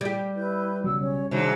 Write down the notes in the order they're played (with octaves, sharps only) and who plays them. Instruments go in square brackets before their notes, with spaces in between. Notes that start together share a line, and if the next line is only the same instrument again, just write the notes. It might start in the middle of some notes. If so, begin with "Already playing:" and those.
[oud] G3 G4
[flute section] E4 B4 G6
[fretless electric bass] B1 C#3 F#3 [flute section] E6
[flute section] C#4 C#5
[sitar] G#2 F#3 [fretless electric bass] C3 D#3 G3 [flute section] D4 E5